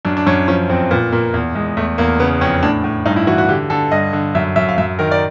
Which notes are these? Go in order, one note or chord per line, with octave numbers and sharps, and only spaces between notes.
F#2 D4
D4
F#2 C#4
F3 C#4
F2 C4
A#2 B3
A#2 A#3
E2
E2 G#3
E2 A3
E2 A#3
C#3 B3
F2 C#4
A2 D4
A2
G2 D#4
E4
E3 F#4
F#4
D3 G4
D3 A4
G2 D#5
D3
F#2 E5
F#2 E5
F5
F#2 E5
D#3 A#4
D5